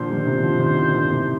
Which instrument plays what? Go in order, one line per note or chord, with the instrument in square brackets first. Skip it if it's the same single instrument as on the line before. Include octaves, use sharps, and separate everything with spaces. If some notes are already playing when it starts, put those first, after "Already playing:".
Already playing: [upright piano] A#2 D3 F3 [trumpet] C5
[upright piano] D#3 G3
C3 D#3
D3 F3
C3 D#3
A#2 D3
A#2 D3
A2 C3